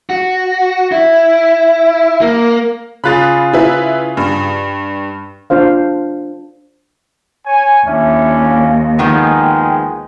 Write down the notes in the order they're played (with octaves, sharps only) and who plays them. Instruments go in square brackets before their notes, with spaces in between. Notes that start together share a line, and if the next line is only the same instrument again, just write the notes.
[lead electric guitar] F#4
E4
A#3
[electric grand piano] C#3 F4 G#4 [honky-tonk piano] B5 F#6 A6
[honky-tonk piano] E4 B4
G2
[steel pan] D4 F4 C5 F5
[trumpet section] C#5 G#5
[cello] D#2 [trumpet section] C#4 D4 E4 [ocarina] E5
[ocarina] F5
[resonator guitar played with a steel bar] D#3 F3 B3 [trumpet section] G#3 [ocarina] G5